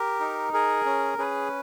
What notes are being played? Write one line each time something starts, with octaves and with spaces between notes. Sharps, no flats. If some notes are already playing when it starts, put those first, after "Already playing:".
Already playing: G4 A#4
D#4
G#4 A#4
C#4
C#4 G#4 B4